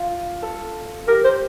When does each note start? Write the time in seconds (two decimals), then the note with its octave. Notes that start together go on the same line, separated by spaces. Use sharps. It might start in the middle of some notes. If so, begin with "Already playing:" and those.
Already playing: F4
0.42 A4
1.08 G4 A#4
1.24 C5